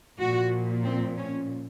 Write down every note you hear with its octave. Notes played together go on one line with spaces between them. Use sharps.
A#2 F3 F#4
C4
C#4